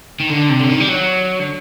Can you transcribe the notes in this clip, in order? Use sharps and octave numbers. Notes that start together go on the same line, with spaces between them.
D#3
D3
C3
D3
D#3
G3
F#3
D3